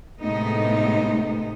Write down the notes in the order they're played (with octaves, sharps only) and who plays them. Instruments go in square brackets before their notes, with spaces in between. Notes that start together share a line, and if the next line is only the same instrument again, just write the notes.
[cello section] A2 C3 G#3 A3 B3 D#4